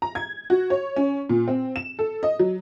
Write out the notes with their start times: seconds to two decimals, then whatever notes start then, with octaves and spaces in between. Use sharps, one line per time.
0.02 A#5
0.15 G#6
0.50 F#4
0.70 C#5
0.96 C#4
1.29 A#2
1.48 C4
1.76 E7
1.99 A4
2.23 D#5
2.39 F#3